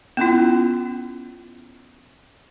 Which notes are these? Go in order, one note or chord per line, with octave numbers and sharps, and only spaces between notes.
B3 C#4 E4 F4